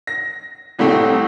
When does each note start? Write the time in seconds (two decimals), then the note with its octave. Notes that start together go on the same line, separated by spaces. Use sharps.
0.07 A#6
0.79 G1 C2 A2 A3 C4